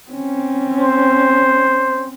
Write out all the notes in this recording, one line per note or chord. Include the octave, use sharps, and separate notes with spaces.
C4 C#4
C5